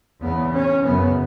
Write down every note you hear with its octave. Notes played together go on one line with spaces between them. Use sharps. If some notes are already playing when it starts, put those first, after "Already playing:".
E2 C#3 B3
C#4
F#2 C#3 B3